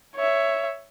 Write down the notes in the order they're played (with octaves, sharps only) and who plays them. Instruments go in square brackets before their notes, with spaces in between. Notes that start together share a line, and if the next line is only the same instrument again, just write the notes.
[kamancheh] C#5 E5